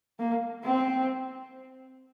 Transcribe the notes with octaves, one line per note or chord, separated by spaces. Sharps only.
A#3
C4